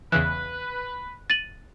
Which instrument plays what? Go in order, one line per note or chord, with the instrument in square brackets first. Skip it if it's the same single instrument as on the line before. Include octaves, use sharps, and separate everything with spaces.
[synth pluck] E2 C#3 E3 [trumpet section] B4 [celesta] F#6
[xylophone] A6 D#7 F#7